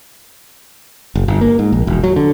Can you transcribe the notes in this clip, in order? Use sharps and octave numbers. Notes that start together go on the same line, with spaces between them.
F#1
G1
A#3
G#2
A#1
E1
F#3
D3